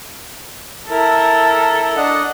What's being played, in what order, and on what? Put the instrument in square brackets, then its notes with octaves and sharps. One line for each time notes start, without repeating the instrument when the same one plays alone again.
[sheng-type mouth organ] E4 A#4 [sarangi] A4
[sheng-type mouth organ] D4 D#5 F#5